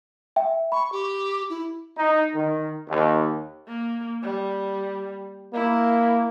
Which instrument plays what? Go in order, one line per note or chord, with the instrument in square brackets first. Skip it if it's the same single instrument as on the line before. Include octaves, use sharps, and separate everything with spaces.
[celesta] E5 G5
[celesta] B5 [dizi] C#6
[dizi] G4
E4
[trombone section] D#4
D#3
D#2
[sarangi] A#3
G3
[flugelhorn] A#3 [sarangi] E4